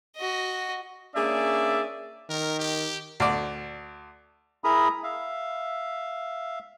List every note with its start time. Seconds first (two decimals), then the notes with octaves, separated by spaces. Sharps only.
0.16 F#4 D#5
1.15 A#3 C#4 D4 G#4 D5 E5
2.29 D#3 A#4
2.59 G4
3.20 D2 D5
4.64 E4 G#4 A#4 A#5 B5 D#6
5.03 E5 F5